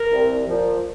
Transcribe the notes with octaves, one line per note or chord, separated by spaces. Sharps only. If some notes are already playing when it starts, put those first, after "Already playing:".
Already playing: A#4
C2
A#2 F3